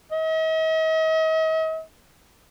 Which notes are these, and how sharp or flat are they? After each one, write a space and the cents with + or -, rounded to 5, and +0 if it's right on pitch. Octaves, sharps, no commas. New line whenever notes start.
D#5 +45